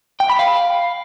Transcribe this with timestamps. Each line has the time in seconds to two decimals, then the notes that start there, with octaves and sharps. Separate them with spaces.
0.20 G5
0.30 B5
0.39 F5